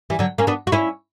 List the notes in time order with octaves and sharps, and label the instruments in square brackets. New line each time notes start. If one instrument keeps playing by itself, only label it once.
[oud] E3 G3
D3 F#3
A#3 C#4
B3 D4
F#4
C#4 E4